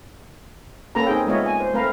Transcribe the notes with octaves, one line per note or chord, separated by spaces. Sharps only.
A#3 C#4 A4 B4 A#5
C4 D#4 G#4 G5
G#3 B3 F4 C#5 D#5 E5
G#5
C5
A3 C4 A#4 B4 F5 A#5